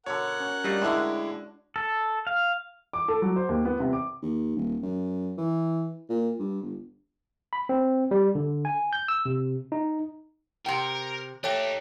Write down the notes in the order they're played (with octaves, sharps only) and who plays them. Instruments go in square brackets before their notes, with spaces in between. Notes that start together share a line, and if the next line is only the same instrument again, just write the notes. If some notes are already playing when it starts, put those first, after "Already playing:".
[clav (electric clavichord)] B2 D3 [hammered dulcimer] F#4 [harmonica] A#4 F#5 [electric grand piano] C#5
[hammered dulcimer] C#4
[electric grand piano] G3 [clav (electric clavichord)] A3 D#4 F4 [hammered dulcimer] D4
[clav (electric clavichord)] A2 D3 [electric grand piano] G#3 E4
[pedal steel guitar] A4
F5
[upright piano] D6
A4
F#3
C5
D#2
B3
C3
D6
[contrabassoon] D#2
D#1
F#2
E3
A#2
G2
G1
[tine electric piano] B5
C4
G3
D3
G#5
G6
E6
C3
D#4
[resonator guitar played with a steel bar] C3 G5 [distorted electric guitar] A#4
[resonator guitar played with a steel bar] A3 [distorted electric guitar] D#4 G4 [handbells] C#5 G5